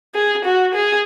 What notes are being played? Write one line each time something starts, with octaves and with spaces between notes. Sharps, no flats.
G#4
F#4
G#4